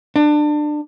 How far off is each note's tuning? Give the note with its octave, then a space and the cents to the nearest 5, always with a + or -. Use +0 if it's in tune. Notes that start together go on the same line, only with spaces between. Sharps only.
D4 +25